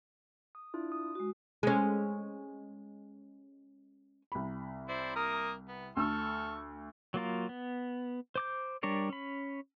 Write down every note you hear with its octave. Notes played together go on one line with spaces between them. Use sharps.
D#6
D4 E4 F4
D#6
G#3 F#4
G#3 C#4
C2 B5
E4 C5 D5
A#3 A#4 D#6
B3
D2 A4 C#6 E6 F6
F#3 A#3 F4 A#4
B3
C5 D6 G6
G3 D4 A#4 C#5 D5
C#4 B5